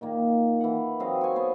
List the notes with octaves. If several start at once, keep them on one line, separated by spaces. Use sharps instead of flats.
A#2 D#3 A#3
E3 F#5
F#3 C4 D#5 F5
C#5 G#5
B3 C5